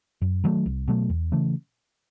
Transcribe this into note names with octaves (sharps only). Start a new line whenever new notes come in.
F#2
D#3 F#3 A3
C2
B2 F#3 A3
E2
C#3 E3 A3